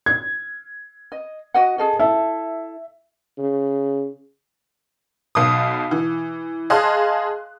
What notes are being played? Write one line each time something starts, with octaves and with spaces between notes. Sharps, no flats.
G#6
D#5
F#4 D#5 F#5
G#4 A4 D#5
E4 A4 E5
C#3
B1 B2 D#6
E3
G#4 D#5 F5 A5 C6 F#6